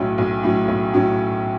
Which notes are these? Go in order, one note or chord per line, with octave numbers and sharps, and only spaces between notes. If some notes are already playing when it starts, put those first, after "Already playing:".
Already playing: B1 A2 F#3 C#4
B1
A2 F#3 C#4
B1
A2 F#3 C#4